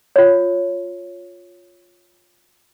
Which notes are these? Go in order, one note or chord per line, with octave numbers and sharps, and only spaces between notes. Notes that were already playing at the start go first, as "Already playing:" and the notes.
F4 C#5